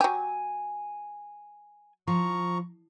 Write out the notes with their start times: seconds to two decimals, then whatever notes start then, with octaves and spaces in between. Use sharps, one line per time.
0.01 F#3 G4 G#5
2.07 F3 A#5 C#6